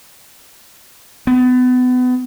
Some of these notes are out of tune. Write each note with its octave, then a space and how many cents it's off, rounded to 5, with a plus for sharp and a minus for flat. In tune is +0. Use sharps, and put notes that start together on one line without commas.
B3 +30